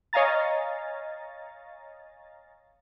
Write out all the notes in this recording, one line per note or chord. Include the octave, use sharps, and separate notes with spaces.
C#5 D#5 F5 G#5 A#5 A6